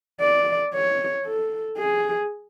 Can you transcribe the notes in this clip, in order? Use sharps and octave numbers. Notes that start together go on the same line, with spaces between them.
D5
C#5
A4
G#4